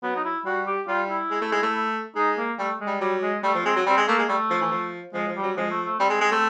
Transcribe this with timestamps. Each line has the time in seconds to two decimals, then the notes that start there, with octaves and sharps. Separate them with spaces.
0.03 F#3 B3
0.16 D#4
0.25 E4
0.45 G3 F#4
0.67 G4
0.87 G3 F4
1.09 E4
1.31 G#3
1.42 A3
1.52 G#3
1.63 A3
2.16 G#3 D#4
2.38 A#3
2.59 G3 A3
2.80 G#3
2.87 G3
3.01 F#3 G3
3.22 G#3
3.44 G3 A3
3.54 F3
3.64 G#3 C4
3.76 F#3
3.86 G3 C4
3.97 G#3
4.08 A3 A#3
4.18 G#3
4.28 G3 A3
4.50 F3
4.61 E3
4.71 F3
5.14 F3 G#3
5.28 F3
5.36 G3
5.43 F#3
5.57 F3 G#3
5.71 A3
5.86 A3
5.99 G3 C4
6.10 G#3
6.21 G#3
6.32 A3